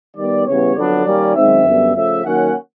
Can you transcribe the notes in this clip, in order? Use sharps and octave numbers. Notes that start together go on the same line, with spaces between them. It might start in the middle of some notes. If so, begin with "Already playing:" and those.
D#3 G3 B3 D5
C#3 E3 G3 B3 C#5
F2 D3 F#3 B3 D4 D5
D#3 G3 A#3 C#4
F#2 D#3 G#3 C4 D#4 E5
F#2 D3 G3 B3
C#3 F3 A3 E5
D#3 F#3 A#3 C#4 F#5